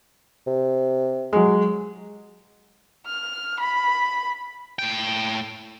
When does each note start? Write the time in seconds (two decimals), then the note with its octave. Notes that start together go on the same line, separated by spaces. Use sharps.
0.47 C3
1.33 F#3 G#3
3.06 F6
3.60 B5
4.79 A2 G5